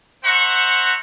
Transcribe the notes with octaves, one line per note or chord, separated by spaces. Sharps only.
C5 E5 F#5 A#5 C#6